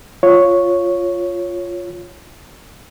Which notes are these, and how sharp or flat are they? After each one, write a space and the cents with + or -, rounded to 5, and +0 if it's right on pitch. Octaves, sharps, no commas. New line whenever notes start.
F4 +0 C#5 +0